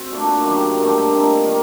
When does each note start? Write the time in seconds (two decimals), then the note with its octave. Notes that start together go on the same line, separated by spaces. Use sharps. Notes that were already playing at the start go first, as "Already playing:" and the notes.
Already playing: C4 F#4
0.12 A#2 A3 D4
0.45 F#2 D#3 F#3 G4
0.78 G2 D#3 A3 D4
1.12 A#2 A3 C4 D#4
1.45 D#3 G3 A#3 A#4